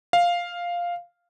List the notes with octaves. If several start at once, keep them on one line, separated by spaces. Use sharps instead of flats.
F5